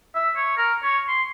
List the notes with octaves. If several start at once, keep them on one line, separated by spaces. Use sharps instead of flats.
E5
C#5
A#4
C#5
C6